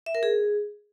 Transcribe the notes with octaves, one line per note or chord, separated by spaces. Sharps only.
E5
A#4
G#4